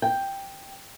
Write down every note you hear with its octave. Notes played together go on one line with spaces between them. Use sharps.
G5